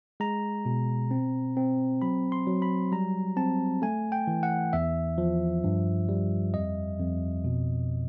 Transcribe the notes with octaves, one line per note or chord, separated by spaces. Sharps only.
G#3 A#5
B2
C4
C4
F#3 B5
C6
F#3
B5
G3 A#5
C4 A5
A3 G#5
G5
E3
F#5
E2 E5
F3
G2
G3
F2 D#5
F2
B2